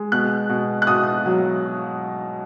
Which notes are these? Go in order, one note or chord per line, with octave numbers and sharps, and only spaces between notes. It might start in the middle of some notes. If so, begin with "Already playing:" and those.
Already playing: G#3
B2 F#6
B2
F#6
B2 D#6
F#3